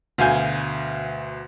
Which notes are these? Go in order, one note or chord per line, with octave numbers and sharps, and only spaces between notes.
D2 B2 F5 G#5 G6